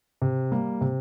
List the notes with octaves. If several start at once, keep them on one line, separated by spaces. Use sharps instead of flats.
C3
G3 A#3
C3